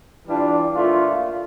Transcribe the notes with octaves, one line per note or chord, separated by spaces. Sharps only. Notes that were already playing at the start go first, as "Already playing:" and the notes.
E3 G3 D4 F4
A#2 A3 D4 F4